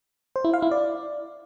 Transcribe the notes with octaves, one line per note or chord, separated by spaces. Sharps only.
C5
E4
F5
E4
D5